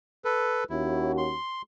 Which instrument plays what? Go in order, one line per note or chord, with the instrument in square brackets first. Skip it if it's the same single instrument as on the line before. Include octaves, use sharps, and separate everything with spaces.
[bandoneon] A4 B4
[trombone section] D#2 C#4 F#4 [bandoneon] E4
[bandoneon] C6